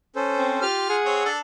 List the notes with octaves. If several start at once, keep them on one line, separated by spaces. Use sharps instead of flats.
C#4 A4 C5
C4
F4 G4 F6
G#4 F#5
C4 C#5
D4 A4